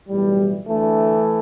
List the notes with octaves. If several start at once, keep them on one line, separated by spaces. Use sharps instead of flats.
B1 A2 E3 G3
D2 D3 E3 A3